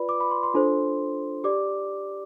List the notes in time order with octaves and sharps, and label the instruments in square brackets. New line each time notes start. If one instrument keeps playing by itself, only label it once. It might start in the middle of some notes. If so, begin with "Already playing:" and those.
Already playing: [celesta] F4 B4 D5 B5
D6
B5
C6
C6
D4 F4 A4 C5
G4 D5 D6